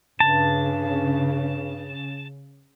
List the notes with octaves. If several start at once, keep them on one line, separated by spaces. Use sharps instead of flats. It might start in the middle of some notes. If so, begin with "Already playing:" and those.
G2 C#3 A5